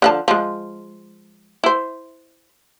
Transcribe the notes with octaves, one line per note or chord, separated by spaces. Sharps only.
D3 F3 A5
F3 G#3
E4 C5